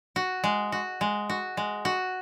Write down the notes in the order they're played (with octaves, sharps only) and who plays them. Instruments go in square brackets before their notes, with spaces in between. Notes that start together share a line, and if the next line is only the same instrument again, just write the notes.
[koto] F#4
G#3
F#4
G#3
F#4
G#3
F#4